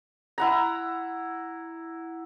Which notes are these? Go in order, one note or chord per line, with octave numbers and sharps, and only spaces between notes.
E4 F#5 A#5